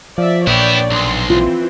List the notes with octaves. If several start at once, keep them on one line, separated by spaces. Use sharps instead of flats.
F3 D5 E5
A#1 B3 E4 C#5 D5 G5
B1 C6
E3 C4 F4